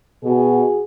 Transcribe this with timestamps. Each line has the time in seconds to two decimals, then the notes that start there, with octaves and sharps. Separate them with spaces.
0.24 B2 F#4 G#4